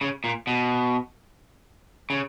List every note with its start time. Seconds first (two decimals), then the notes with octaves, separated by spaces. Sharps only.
0.01 C#3
0.24 A#2
0.47 B2
2.10 C#3